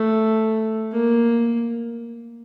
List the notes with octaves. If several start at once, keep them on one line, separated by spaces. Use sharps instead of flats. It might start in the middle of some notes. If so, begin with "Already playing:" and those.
Already playing: A3
A#3